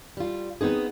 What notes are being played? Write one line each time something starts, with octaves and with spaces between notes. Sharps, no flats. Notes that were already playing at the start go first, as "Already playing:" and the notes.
G3 F4
B3 C4 D#4 G#4